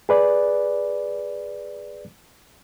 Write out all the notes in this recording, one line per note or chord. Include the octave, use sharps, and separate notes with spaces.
G#4 B4 D5